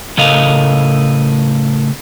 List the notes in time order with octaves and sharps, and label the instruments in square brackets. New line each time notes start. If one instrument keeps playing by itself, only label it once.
[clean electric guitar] A2 C#3 A3 A#4 D#5 F5